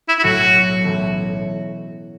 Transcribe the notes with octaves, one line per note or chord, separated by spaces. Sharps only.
E4
E4
B1 A2 F#3 A3 F#4
B1 A2 E3 A3 C#4